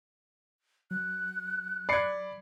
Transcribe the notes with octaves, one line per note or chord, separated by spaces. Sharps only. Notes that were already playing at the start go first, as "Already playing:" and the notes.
F#3 F#6
D5 B5 G#6 C7 C#7